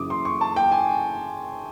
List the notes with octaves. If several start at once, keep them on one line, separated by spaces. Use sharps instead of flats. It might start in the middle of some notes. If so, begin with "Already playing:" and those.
Already playing: F#2 C#3 E3 D6 D#6
C6
C#6
A5
G5
G#5